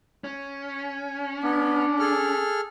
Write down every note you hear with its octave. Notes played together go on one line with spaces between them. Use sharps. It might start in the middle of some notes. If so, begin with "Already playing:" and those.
C#4
B3 D4
G#4 A4 F6